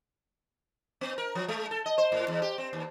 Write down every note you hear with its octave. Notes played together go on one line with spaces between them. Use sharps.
B3
A#4
F3
G#3
A4
D#5
C5
A2
E2
G4
C4
D#2